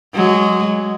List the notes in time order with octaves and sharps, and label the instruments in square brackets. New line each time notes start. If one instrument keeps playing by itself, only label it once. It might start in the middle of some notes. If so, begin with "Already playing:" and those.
[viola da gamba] F#3 G#3